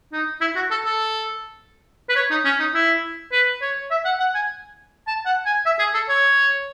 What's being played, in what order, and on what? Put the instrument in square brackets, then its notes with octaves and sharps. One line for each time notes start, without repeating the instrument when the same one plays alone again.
[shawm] D#4
E4
F#4
A4
A4
B4
C#5
D#4
C#4
D#4
E4
B4
C#5
E5
F#5
F#5
G#5
A5
F#5
G#5
E5
G#4
A4
C#5